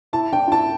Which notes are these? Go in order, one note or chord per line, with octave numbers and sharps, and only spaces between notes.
E4 A5
D4 G5
F4
E4 A5